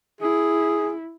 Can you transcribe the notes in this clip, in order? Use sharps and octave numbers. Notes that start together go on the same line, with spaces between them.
E4 G#4